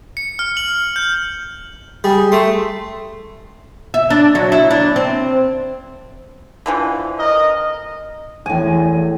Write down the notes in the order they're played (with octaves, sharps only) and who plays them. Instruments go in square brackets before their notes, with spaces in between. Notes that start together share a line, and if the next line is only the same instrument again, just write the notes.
[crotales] C#7
F6
F#7
G6
[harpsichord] G3 [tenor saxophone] G#4
[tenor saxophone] A3 [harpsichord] C6
[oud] E5
D4
F#3
E4
D4
C4
[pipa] D3 E3 F3
[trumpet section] A#4 D#5
[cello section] E2 [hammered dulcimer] A2 G#5